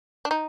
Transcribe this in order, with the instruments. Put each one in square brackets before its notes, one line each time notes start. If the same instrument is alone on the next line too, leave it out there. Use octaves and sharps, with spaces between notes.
[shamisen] D4
D#4